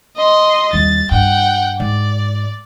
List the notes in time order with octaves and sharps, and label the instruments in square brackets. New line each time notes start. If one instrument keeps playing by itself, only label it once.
[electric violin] D#5 C6
[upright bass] D#2 G3 [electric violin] A6
[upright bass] G2 [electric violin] F#5 G5
[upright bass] G#2 [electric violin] D5